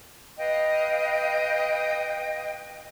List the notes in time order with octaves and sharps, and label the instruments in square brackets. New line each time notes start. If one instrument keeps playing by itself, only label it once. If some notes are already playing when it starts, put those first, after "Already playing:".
[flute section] B4 D#5 F5 G5